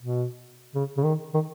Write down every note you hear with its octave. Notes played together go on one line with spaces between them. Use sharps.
B2
C#3
C#3
D#3
D#3